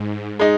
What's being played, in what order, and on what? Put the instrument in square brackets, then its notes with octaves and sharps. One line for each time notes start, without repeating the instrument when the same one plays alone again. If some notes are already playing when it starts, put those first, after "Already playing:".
Already playing: [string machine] G#2
[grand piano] G#3 D#4